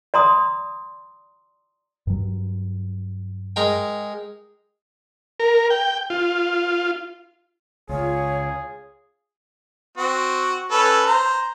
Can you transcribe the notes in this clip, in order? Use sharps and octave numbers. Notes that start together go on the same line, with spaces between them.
D5 A#5 C6 D#6
G2 F#3
G#3 A#4 G5
A#4
G5
F4
C#2 F4 G#4 C#5
C4 F#4
C#4 A4 B4
C5 A#5